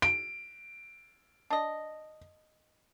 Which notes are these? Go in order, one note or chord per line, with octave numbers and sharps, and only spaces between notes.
D7
D4 D#5